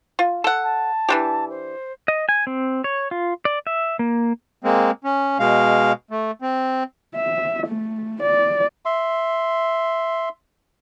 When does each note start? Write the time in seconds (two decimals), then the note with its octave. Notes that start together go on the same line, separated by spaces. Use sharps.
0.19 F4
0.44 A4 F#5
0.63 A5
1.09 E3 D4 G4
1.50 C5
2.08 D#5
2.29 G#5
2.47 C4
2.84 C#5
3.11 F4
3.45 D5
3.67 E5
3.99 A#3
4.64 G#3 A#3 C4
5.04 C#4
5.39 B2 G#3 F5
6.11 A3
6.42 C4
7.15 E5
7.67 A3
8.23 D5
8.85 E5 C6